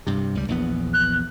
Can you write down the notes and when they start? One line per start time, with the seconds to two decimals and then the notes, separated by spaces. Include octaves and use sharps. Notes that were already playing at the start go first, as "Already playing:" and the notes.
0.07 G2 C3
0.35 C#2 G3
0.48 A#1 E2 B3
0.94 F#6